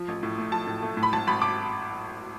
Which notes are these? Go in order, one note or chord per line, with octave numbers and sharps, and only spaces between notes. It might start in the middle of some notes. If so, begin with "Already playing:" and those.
Already playing: F3
A1
A2
A3
F3 A5
A2
A3
A2
B5
G#1 A5
G#1 B5
D6